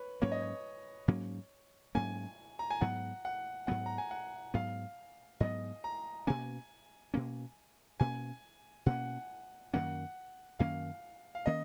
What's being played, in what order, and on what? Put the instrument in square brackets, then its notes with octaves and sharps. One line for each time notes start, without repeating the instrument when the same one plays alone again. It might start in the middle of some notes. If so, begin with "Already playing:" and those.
Already playing: [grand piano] B4 C#5
[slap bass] G#2 F#3 A#3 C#4 [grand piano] C#5
[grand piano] D#5
C#5
[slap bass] G#2 F#3 A#3 C#4
[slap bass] G#2 F#3 A#3 C#4 [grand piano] G#5
[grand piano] A#5
G#5
[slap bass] G#2 F#3 B3 [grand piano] F#5
[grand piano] F#5
[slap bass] G#2 F#3 B3 [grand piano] F#5
[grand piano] A#5
G#5
F#5
[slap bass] G#2 F#3 B3 [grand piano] F5
[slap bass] G#2 F#3 B3 [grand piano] D#5
[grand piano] A#5
[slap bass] B2 A#3 C#4 [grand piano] G#5
[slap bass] B2 A#3 C#4
[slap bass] B2 A#3 C#4 [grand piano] G#5
[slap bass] B2 A#3 C#4 [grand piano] F#5
[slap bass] F#2 D#3 A#3 C#4 [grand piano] F#5
[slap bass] F#2 D#3 A#3 C#4 [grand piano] F5
[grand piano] F5
[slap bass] D#3 A#3 C#4 [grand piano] D#5